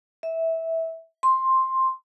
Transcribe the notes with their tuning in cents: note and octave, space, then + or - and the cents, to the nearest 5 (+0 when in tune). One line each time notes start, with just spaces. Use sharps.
E5 -15
C6 +10